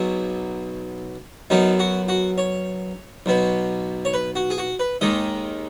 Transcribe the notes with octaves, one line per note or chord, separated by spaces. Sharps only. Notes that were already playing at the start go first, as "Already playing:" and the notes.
Already playing: B1 B2 F#3 G#4
F#2 F#3 B3 D#4
F#4
F#4
C#5
B1 B2 B3
C#5
B4
F#4
G#4
F#4
B4
D#2 D#3 G#3 D#5